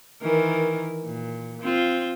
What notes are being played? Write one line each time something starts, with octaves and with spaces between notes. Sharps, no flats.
D#3 E3 A#4
A#2
C4 F4